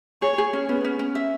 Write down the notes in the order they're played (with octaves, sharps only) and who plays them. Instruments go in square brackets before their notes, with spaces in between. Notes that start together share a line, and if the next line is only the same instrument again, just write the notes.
[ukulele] G#4 [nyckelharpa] C#5
[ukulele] G#4
C#4
[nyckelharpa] B3 [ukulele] C#4
[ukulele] C#4
C#4
E5